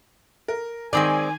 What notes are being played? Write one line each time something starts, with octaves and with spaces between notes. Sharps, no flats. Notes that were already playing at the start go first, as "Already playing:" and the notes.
A#4
D#3 G#3 C4 D5 G#5